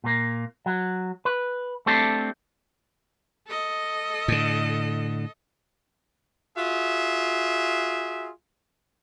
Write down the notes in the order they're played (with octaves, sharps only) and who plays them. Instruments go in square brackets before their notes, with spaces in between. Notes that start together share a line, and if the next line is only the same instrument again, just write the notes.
[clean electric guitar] A#2 A#3
F#3
B4
A3 C4 D4 G4 A4
[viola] A4 D#5
[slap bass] A2 D3
[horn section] F4 F#4 G#4 E5